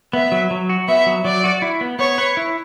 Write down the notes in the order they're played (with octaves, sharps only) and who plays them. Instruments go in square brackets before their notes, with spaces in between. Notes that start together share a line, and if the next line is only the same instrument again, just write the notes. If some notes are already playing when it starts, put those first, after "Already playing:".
[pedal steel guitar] B3 [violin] E5
[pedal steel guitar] F#3
F#3
F#4
[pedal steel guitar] B3 [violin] E5
[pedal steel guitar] F#3
[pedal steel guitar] F#3 [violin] D5
[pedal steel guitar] F#4
E4
B3
[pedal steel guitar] B3 [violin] C#5
[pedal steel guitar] B4
E4